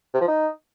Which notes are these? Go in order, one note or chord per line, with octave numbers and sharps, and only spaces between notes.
C3
F3
D#4